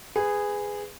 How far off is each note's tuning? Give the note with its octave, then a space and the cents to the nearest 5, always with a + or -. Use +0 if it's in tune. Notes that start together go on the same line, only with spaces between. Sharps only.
G#4 -10 B4 +20